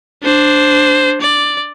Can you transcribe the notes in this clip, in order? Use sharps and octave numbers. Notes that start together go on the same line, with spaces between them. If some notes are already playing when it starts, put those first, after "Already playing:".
D4 C5
D5